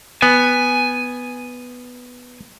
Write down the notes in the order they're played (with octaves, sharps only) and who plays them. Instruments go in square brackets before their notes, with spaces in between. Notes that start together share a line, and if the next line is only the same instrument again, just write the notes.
[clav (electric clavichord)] B3 [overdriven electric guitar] G#5